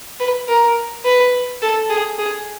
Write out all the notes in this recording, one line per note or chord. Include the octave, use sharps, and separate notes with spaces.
B4
A#4
B4
A4
G#4
G#4